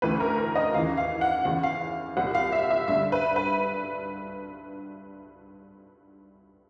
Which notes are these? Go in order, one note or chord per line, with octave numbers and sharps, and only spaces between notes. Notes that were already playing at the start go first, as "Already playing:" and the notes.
D2 C#3 E3 B4
A#4
A#4
D#5
D#2 C#3 E3 F5
F5
F#5
E2 C#3 E3 F#5
F5
C2 A#2 F#5
F5
E5
E5
G2 D3 E5
B4
B4